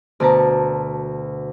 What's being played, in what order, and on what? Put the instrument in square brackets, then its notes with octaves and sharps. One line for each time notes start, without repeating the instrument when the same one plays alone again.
[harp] D2 B2 A5 A#5